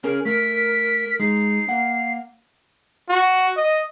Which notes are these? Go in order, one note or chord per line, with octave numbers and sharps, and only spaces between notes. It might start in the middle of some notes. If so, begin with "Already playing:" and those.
C#4 G#4 A#4
A3 A#4 B6
G#3 D#4 C7
A#3 F#5
F#4
D#5